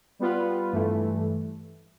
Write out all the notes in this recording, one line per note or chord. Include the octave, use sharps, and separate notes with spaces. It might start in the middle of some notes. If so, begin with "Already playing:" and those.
G3 B3 F4 B4
G2 E3 A3